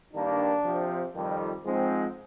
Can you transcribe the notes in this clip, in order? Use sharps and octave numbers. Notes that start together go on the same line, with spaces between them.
G2 D#3 A#3 D4
C3 F3 C4
F2 D#3 G3
G#2 F3 G#3 C4